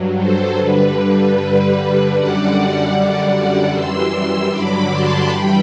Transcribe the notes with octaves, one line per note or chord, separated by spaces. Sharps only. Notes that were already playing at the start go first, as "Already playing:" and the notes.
Already playing: G2 F#3
A4 C5
G2 D3 G3 B4
G2 D3 G3 B4
F#2 D3 G3 D5 F#5
F#2 D3 G3 D5 F#5
F#2 E3 G3 C6 E6
G2 D3 F#3 B5 D6
A5 C6
G2 E3 G3 G5 B5